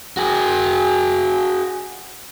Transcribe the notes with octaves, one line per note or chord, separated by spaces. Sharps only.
F#4 G#4